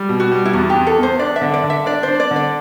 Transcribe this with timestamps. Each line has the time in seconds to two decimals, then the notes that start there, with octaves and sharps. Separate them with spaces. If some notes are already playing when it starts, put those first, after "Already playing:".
Already playing: G3
0.09 B2
0.20 F#4
0.32 G3
0.45 E4
0.53 E2 F#4
0.70 G4
0.75 E2
0.87 A4
0.98 E2 C5
1.19 D4 D5
1.36 E5
1.42 D3
1.54 D5
1.64 D3
1.70 E5
1.86 D4 D5
2.03 D4 C5
2.20 D5
2.31 D3
2.36 D5